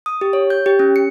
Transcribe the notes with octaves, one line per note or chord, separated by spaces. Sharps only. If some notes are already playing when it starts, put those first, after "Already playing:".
D#6
G4
C#5
G6
G4
C#4
C#7